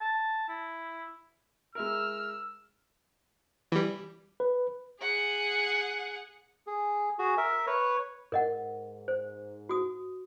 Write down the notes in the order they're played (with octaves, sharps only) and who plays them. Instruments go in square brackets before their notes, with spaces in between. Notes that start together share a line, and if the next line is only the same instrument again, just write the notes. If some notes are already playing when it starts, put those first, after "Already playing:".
[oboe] A5
E4
[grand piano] G#3 E4 A#4 [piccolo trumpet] E6 [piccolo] F6
[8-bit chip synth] E3 G3
[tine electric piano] B4
[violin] G#4 F#5
[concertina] G#4
F#4 G#4
A#4 E5
B4 C#5
[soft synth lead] G#2 [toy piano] A#4 D#5 F#5
[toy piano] C5
F#4 D#6